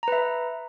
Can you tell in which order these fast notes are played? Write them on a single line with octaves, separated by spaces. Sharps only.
A#5 B4 E5